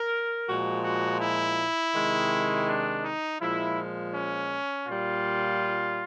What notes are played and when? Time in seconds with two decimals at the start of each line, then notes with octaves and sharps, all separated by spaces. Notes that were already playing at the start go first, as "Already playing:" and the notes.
Already playing: A#4
0.47 A#2 F3 G#3 F#4
0.84 F#4
1.21 E4
1.95 C3 D#3 G#3
2.67 D4
3.04 D#4
3.40 A#2 F3 G#3 E4
4.14 C#4
4.86 A#2 G3 F4